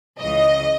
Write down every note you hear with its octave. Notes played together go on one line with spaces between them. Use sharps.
C#2 C#3 E3 D#5